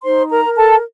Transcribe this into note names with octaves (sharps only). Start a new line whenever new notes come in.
D#4 C5 C6
A#4 A#5
A#4
A4 A5